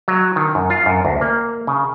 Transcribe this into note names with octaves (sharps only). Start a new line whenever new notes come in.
F#3
D#3
F#2
F4
F#2
D2
A#3
C#3